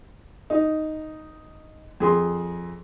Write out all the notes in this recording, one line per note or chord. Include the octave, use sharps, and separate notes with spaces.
D#4
F2 G#4 C6